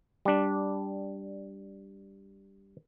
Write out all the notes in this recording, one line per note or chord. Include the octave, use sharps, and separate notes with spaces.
G3 D4